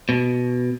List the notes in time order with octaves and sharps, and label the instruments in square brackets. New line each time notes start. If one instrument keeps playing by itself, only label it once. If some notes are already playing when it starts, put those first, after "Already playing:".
[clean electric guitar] B2